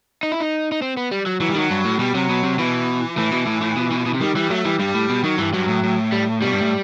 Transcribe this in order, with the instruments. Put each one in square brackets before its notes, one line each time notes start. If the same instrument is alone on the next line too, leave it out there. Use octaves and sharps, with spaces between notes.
[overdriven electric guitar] D#4
E4
D#4
D#4
C4
B3
G3
F#3
[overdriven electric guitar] E3 [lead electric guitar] F#3
[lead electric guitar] G3
[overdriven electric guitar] D#3 [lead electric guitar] F#3
[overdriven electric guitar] G2
A2
[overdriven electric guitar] B2 [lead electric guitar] G3
[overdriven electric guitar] C3 [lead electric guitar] F#3
[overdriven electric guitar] B2
C3
[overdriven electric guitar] B2 [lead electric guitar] E3
[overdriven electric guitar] A2 [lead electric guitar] E3
[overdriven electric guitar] B2
A2
A2
B2
B2
B2
C3
[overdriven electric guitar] D#3 [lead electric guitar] G3
[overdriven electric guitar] E3 [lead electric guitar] G3
[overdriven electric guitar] F#3 [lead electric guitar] A3
[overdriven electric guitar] E3 [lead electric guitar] G3
[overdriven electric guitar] G2 [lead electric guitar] G3
[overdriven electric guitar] A2
B2
[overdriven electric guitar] D#3 [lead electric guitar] F#3
[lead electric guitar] G2 [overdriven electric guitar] E3
[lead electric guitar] G2 [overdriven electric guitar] F#3
[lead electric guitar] A2
A2
[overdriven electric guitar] G3
[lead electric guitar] B2 [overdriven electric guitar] G3
[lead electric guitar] G2
A2